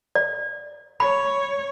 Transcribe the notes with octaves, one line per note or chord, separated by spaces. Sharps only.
D5
C#5 B5